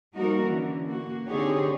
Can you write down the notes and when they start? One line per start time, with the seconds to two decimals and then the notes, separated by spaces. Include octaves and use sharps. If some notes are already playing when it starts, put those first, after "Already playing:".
0.15 F3 G3 A#3 D#4 F#4 A#4
0.44 D3 E3 C#4
0.87 A#3 F#4
1.29 D3 C4 D#4 G4 G#4 C#5